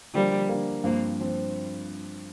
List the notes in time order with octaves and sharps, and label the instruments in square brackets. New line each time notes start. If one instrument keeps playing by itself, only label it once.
[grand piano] D3 F3 A#3 [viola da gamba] G3
[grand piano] D3 F3 A#3
[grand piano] G2 F3 C4 [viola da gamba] A#3
[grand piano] F3 C4